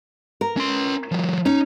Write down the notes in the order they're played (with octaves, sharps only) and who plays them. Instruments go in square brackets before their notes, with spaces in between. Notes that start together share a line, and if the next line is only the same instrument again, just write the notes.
[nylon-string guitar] A#4
[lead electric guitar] C#4 C6
F3 G3
[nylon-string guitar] C#4 [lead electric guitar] D#4